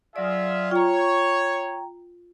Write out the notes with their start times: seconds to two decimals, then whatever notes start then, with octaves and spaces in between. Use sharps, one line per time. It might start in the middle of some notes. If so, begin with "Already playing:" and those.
0.16 F#3 F4 G#4 D5 E5
0.71 F4 C#5 G5 A#5